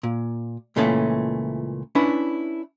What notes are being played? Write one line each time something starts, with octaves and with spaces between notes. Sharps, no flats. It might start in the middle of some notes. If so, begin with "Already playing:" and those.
A#2
C#2 A#2 E3 A3 C#4 A5
C#4 D4 E4 B4